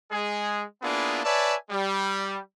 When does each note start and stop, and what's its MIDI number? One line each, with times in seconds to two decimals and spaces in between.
0.11 0.63 56
0.11 0.63 68
0.82 1.23 58
0.82 1.23 59
0.82 1.23 62
0.82 1.23 64
0.82 1.23 65
0.82 1.23 68
1.24 1.55 71
1.24 1.55 73
1.24 1.55 74
1.24 1.55 76
1.24 1.55 80
1.24 1.55 81
1.70 2.38 55